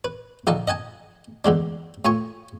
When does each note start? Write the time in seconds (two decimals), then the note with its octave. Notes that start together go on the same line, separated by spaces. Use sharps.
0.04 B4
0.47 A#1 D3 D#4 F5 A5
0.68 D#5 F#5 G#5 A5
1.45 E2 D3 G#3 D4
2.05 A2 F4 G#5 C#6